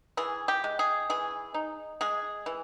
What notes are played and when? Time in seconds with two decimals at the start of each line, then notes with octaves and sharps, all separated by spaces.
0.17 E3 G#4
0.48 G4
0.64 G#3
0.79 G#4
1.10 E3 G#4
1.54 D#4
2.01 G#3 G#4
2.46 E3